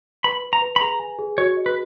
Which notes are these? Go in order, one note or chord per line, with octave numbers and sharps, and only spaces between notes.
B4 B5
B4
A#5
B4
B5
G#4 A#5
G#5
G#4
F#4 C#5
D#5
B4